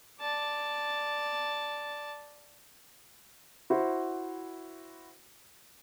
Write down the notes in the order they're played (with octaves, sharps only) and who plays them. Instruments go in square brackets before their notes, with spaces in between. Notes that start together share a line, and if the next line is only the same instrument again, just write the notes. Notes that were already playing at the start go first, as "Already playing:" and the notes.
[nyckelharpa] D5 A5
[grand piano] E4 F#4 C5